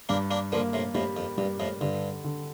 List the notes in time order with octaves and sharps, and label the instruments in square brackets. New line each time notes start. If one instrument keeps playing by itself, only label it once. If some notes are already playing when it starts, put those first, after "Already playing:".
[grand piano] G2 [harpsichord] A#3 D4
[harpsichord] A#3 D4
[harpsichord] D3 F3 [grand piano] A#3
[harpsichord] A2 C3
[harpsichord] F2 A2 [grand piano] G3
[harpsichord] F2
[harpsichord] G2 [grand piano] G3
[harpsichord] F2 A2
[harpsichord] G2 [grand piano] D3
[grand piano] D3